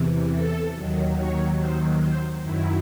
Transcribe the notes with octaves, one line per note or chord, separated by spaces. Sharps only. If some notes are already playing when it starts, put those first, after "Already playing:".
Already playing: E2 C3 E3
A4
D#2 D#3 F#3
C#5
C5
C5
F#2 D#3 F#3 E4